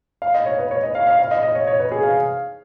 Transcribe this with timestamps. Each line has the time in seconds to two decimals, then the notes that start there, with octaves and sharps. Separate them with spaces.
0.22 F5
0.34 D#5
0.46 C#5
0.58 B4
0.71 C#5
0.83 D#5
0.95 F5
1.07 F5
1.19 F5
1.31 D#5
1.43 D#5
1.55 C#5
1.67 C#5
1.79 B4
1.92 G#4
2.03 F5